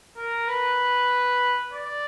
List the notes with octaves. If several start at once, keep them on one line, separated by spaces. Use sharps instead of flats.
A#4
B4
D5